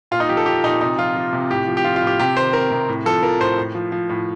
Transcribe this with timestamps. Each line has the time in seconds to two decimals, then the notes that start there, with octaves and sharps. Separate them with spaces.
0.11 A#2 F4
0.20 D#4
0.29 F3 G4
0.37 A4
0.46 F3 G4
0.64 A#2 D#4
0.81 C3 D#4
0.98 F3 F4
1.16 F3
1.33 C3
1.50 A2 G4
1.67 F3
1.77 G4
1.84 F3 F4
1.96 F4
2.02 A2
2.07 G4
2.19 C3 G4
2.37 D#3 C5
2.53 D#3 A#4
2.71 C3
2.89 A2
3.06 F3 A4
3.23 F3 A#4
3.40 A2 C5
3.58 A2
3.75 F3
3.92 F3
4.09 A2